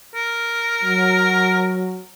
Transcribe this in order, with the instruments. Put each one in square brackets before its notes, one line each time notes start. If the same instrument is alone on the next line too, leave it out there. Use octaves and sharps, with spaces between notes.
[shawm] A#4
[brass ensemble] F#3